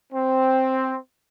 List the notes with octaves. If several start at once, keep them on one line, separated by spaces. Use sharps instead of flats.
C4